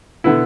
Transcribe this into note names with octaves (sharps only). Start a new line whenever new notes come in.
B2 D3 B3 E4